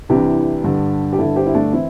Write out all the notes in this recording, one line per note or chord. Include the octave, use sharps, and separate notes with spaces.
C2 C3 E3 D4 G4
G2 D3
G4
G2 D3 E4 A4
G4 C5
E4
A3 D4
E3 C4 E4